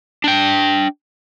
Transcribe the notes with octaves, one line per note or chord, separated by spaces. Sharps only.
D4 G5